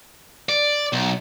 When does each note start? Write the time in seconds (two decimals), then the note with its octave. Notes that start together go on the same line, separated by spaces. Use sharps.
0.49 D5
0.93 B1